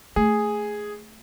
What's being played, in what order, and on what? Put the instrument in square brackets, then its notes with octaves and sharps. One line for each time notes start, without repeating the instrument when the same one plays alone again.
[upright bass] A3 [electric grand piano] G#4